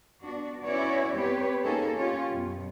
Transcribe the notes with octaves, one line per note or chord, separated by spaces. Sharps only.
B3 D4 F#4
C#4 E4 F#4 B4 C#5 D5
B3 C4 G4 B4 C#5
A#3 C#4 D#4 G#4 A4
C#4 F4 G4 C#5
F#2 B2